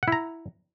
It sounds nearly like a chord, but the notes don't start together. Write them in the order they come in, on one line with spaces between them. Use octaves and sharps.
F#5 E4 A#5